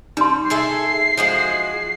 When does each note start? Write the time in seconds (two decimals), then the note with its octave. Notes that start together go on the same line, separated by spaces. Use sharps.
0.17 G3 D#4 C6
0.50 G#4 A4 E5 C7
1.17 F3 G#3 F#4